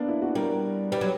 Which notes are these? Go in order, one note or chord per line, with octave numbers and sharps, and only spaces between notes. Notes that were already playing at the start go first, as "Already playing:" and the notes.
Already playing: A#3 B3 D4
E4
F#4
G3 A#4
G3 B4
F#3